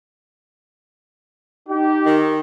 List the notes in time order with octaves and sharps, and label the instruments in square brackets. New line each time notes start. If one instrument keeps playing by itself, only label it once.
[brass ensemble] D#4 G4
[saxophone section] D#3